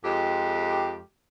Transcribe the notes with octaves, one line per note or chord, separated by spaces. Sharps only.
F2 G#3 G4